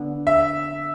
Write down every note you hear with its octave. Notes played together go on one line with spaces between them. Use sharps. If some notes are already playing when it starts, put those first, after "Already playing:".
Already playing: D3 B3
E5